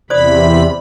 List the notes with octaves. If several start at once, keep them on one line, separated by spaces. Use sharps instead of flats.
E2 C3 C5 D5 B5 D#6